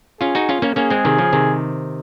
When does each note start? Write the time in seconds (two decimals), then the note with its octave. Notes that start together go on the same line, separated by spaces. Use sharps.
0.20 C#4 F4 G#4
0.35 D#4 F#4
0.49 C#4 F4
0.62 A#3 C#4
0.76 A#3 C#4 G#4
0.90 G#3 C4
1.05 C3 D#3
1.18 C#3 F3
1.33 C3 D#3